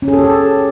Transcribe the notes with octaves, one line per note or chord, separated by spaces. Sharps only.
C#4
G#4
A4
G4
A4